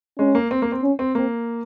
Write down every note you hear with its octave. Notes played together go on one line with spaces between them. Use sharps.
G#3 C#4
A#3
C4
A#3
C4
C#4
C4
A#3 C4